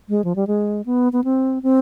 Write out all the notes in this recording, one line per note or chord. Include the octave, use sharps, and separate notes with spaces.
G#3
F3
G3
G#3
B3
B3
C4
C4